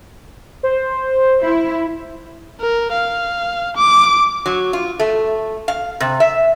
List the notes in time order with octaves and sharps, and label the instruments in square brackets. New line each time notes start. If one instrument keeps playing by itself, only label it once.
[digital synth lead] C5
[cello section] E4
[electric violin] A#4
F5
D6
[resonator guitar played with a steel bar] F#3
F4
A3
F5
C3
E5